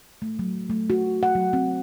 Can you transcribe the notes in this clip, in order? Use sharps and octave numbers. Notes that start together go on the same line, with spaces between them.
A3
F#3
A3
F#4
F#5
F#3
C4